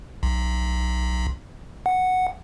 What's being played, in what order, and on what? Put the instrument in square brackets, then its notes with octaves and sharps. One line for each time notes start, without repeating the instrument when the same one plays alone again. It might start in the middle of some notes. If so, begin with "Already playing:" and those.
[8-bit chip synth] B1
F#5